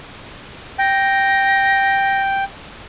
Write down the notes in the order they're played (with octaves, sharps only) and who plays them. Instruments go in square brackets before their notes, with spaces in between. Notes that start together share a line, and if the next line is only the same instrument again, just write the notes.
[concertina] G5 [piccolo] A#6